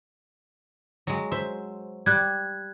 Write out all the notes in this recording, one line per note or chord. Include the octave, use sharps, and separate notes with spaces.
F#3 G#3
C5 E5
G3 F#6 G#6